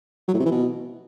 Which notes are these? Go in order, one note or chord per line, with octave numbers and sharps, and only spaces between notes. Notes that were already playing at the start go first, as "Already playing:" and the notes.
F#3
A2
C3
E3
B2